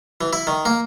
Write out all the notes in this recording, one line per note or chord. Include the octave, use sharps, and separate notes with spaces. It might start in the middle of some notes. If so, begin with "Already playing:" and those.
E3
E4
D#3
A#3